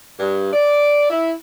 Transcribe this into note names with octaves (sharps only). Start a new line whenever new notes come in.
G2
D5
E4